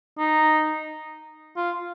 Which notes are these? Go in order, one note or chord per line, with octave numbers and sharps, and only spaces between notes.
D#4
F4